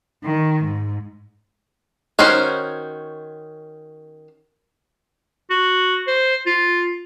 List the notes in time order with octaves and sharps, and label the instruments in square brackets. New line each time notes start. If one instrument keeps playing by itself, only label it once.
[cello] D#3
G#2
[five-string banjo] D#3 C#4 F#4 C5
[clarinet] F#4
C5
F4